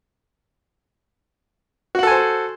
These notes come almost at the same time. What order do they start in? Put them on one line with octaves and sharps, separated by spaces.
F#4 F#5 A4 G#5 C5